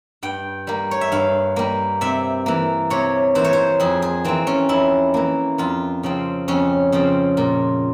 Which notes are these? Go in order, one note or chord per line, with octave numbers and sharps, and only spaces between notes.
G2 G5
G3 A#3
C#5
E5
G2 F5
G3 A#3
C3 E5
E3 A#3
C3 C#5
E3 A#3 C5
C#5
C5
F2 G#4
G#4
E3 A#3 C4
C#4
F2 E4
E3 A#3
F2 F4
C#3 F3 C4
F2 C#4
C#3 F3 C4
A#2